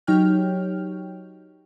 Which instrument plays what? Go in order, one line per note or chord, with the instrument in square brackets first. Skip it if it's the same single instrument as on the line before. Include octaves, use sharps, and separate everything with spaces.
[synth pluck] F#3 D#4 G4 C#5 G5 F6